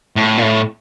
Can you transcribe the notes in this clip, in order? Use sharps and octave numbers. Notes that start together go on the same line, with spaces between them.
A2
A#2
A2